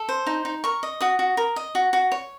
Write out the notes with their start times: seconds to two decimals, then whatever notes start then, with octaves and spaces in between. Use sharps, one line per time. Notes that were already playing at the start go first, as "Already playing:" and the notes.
Already playing: A4
0.09 C5
0.27 D#4
0.45 D#4
0.64 A#4 C#6
0.83 D#5
1.01 F#4 D#6
1.19 F#4
1.37 A#4
1.56 D#5
1.75 F#4
1.93 F#4
2.12 C#5